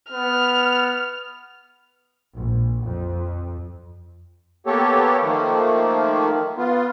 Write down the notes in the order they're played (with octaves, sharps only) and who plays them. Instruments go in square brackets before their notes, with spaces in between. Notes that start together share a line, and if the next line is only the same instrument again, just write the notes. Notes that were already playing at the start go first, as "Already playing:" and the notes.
[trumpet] B3 [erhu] F6
[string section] A#1
F2
[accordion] A#3 B3 G4 A4 C#5
D#3 F3 A3 A#3
B3 F4